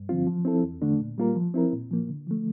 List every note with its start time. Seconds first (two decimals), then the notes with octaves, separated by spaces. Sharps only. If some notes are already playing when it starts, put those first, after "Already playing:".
Already playing: G2
0.09 D3 F3 C4 F4
0.27 F3
0.45 C4 E4 A4
0.63 E2
0.82 D3 A3 D4
0.99 A#2
1.18 G3 A#3 F4 A#4
1.36 F3
1.54 C4 E4 A#4
1.73 A#2
1.91 F3 A#3
2.09 D3
2.27 F3 A3